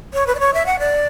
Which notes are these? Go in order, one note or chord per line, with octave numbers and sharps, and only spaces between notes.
C#5
B4
D5
C#5
E5
F#5
D5